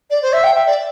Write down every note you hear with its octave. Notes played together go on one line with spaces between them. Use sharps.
D5
C5
E5
G5
E5
D5